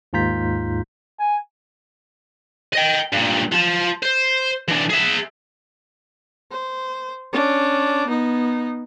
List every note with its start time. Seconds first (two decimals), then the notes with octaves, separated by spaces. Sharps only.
0.13 D#2 G#2 F4 A#5 G6 B6
1.19 G#5
2.73 D#5 G5
3.13 G2 A#2
3.52 F4 A5
4.03 C5
4.68 E3 D4
4.90 G#4 E5
6.51 C5
7.33 C#4 D4
8.07 B3 D#4